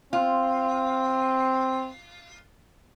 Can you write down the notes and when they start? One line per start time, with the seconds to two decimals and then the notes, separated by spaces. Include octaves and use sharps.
0.13 C4 F4